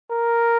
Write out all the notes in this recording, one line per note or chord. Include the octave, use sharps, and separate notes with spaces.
A#4